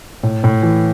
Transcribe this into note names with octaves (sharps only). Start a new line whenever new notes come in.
A2
A2
E3